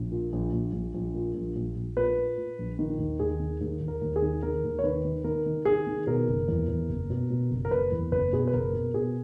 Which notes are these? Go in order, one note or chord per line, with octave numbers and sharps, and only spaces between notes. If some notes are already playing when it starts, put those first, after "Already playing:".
Already playing: A#1
A#2
A#1
A#1
A#1
A#1
A#2
A#1
A#1
A#1
A#2 B4
A#2
A#2
A#1
D#3
D#2
D#2 G#4
D#3
D#2
D#2
A#4
D#2
G#4
D#3
D#3 A#4
D#2
C#5
D#3 B4
D#3
D#3 A#4
D#3
D#3 G#4
D#3
B2 A#4
F#1
E2
E2
F#1
B2
B2
F#1
A#4
F#1 B4
E2
F#1 B4
B2 G#4
B4
F#1 A#4
B2
B2 G#4